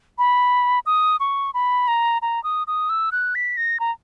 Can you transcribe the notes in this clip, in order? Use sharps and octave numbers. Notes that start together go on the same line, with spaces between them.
B5
D#6
C#6
B5
A#5
A#5
D#6
D#6
E6
F#6
B6
A#6
A#5